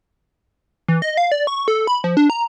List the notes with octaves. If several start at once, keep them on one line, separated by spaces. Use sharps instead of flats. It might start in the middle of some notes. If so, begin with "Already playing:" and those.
E3
D#5
F5
D5
C#6
A4
B5
F3
D4
A#5